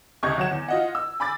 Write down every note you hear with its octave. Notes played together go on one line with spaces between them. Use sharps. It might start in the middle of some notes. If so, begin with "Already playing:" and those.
C#2 C3 D#5 C#6 G6 G#6
F#3 F#5 E7
E2
F4 D#5 F#5
E6
G#5 B5 D6 A6